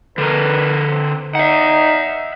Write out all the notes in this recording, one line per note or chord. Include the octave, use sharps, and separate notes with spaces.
D3 A#4 B4
C4
D#4 E5 F#5